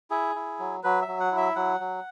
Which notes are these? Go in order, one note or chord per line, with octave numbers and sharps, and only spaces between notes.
E4 G#4
E4
F#3
F#3 B4
E5
F#3
F#5
E4
E5
F#3 F#5
F#3